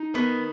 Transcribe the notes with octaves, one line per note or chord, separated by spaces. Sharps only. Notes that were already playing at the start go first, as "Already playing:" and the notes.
Already playing: D#4
B3 A#4